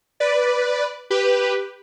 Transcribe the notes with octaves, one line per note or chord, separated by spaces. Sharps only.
B4 D5
G4 B4